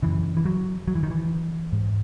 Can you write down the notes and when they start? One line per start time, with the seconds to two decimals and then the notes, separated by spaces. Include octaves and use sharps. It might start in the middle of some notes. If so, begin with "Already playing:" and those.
0.02 F#2 C#3 E3
0.37 E3
0.46 F#3
0.88 F#3
0.95 E3
1.03 D#3
1.10 E3
1.72 G#2